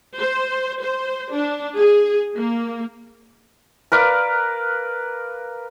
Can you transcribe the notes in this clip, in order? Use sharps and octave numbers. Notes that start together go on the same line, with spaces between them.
C5
C5
D4
G#4
A#3
A#4 B4 D5 F5